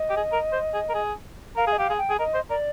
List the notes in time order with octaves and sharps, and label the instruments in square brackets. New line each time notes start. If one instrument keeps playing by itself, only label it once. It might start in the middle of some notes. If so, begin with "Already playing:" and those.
Already playing: [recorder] D#5
[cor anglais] G4
G#4
A#4
C5
G#4
A#4
G#4
[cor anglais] A#4 [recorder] F5
[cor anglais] G#4
[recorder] D#5
[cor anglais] G4 [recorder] F5
[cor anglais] G#4
[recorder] G5
[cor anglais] G#4
[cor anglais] A#4 [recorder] D#5
[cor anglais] C5
[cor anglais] A#4 [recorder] D5